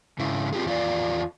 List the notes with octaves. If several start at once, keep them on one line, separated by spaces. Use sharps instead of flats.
G#2 C#3 E4
C4 F4 G4 G#4
E2 F4 D5